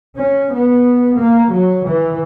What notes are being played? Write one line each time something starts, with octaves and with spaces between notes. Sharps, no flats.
C#4
B3
A#3
F#3
E3